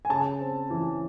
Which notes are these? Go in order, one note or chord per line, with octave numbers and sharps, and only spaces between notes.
G#5
C#3 A5
C4
E3